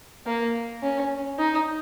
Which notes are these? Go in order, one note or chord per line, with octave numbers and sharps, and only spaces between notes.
A#3
C#4
D#4